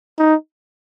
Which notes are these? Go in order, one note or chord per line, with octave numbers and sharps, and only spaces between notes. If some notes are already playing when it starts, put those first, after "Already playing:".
D#4